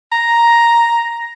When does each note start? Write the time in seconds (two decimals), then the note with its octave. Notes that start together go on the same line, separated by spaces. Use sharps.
0.12 A#5